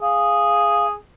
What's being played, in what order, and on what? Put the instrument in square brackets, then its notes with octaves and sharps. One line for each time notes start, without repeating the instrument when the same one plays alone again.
[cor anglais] G#4 [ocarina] F5